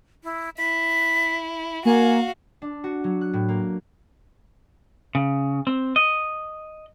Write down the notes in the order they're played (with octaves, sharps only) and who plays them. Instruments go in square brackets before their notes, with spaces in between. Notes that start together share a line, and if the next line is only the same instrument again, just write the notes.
[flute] E4
[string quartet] E4 [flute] B6
[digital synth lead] A#3 [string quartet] F#4 F5 [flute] G#5
[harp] D4
F#4
F#3
F#6
A2
A#3
[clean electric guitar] C#3
C4
D#5